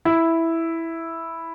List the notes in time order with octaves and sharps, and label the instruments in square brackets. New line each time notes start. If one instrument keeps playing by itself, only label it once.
[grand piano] E4